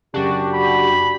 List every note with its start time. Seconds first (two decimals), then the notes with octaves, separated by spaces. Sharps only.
0.14 F#2 C#3 D4 F#4 G4
0.54 B5